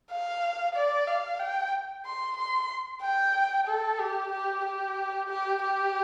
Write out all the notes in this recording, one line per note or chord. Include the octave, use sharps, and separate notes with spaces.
F5
D5
F5
G5
C6
C6
G5
A4
G4
G4
G4
G4
G4